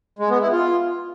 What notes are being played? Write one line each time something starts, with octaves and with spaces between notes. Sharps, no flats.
G#3
B3
E4
F4